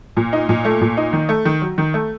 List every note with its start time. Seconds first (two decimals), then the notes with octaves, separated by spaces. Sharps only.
0.17 A#2
0.33 D#4
0.49 A#2
0.65 A3
0.81 A#2
0.97 D#4
1.13 D#3
1.29 A3
1.45 D#3
1.62 F#3
1.78 D#3
1.94 A3